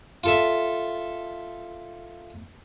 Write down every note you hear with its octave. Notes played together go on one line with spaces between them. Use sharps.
F4 A4 E5